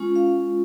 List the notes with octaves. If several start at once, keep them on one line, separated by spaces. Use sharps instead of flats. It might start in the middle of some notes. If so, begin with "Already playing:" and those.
Already playing: G#3 C#4 F4
F5